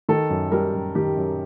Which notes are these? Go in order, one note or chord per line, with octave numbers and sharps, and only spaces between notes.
D#3 A4
F#2
G3 A#4
F#2
D#3 G4
F#2